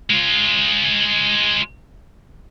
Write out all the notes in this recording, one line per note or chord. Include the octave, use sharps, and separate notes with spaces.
G#3 F4